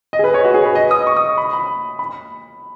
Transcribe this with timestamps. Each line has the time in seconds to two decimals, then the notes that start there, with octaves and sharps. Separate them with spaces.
0.13 D#5
0.19 G#4
0.24 B4
0.34 C#5
0.44 F#4
0.54 G#4
0.65 B4
0.75 D#5
0.91 D#6
1.07 C#6
1.16 D#6
1.38 B5
1.53 B5
1.99 B5